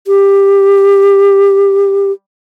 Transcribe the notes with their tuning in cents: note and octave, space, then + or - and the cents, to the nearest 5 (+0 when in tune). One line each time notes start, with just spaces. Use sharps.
G4 +15